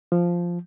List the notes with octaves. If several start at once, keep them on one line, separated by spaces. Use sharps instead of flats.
F3